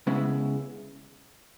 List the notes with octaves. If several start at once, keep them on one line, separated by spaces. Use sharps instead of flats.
C#3 G#3 B3 E4